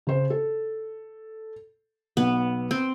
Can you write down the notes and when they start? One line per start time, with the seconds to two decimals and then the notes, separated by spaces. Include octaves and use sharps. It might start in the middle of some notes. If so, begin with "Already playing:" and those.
0.07 C#3 C5
0.30 A4
2.17 B1 B3
2.71 C4